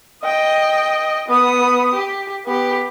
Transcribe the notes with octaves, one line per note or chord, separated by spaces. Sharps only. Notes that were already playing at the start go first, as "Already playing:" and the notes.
D#5 G5
B3 D#6
G4
B3 G4